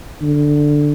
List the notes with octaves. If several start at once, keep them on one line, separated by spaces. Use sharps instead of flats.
D3